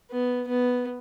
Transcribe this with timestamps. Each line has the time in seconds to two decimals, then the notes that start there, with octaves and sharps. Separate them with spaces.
0.11 B3
0.48 B3